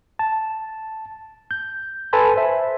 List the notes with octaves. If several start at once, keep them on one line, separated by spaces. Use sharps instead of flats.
A5
G6
A4 B4 G#5 A5 B5 C6
C5 E5